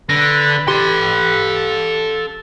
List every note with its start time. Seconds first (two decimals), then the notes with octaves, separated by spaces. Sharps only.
0.09 D3 B4 A#6
0.68 G4 A4 C6